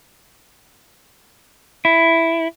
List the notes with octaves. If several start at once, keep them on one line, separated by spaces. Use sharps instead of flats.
E4